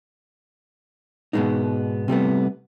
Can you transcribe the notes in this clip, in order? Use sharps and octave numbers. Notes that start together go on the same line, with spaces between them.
G#2 B2 F#3 G#3 B3 D#4
C3 G3 A3 B3